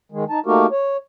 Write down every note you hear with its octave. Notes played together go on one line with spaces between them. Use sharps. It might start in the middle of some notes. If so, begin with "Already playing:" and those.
D#3 G#3
D#4 A5
A3 A#3 D#4 F#4 G4 A#4
C#5